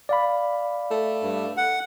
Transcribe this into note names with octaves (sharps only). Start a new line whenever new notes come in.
D5 F5 B5
A3
G2
F#5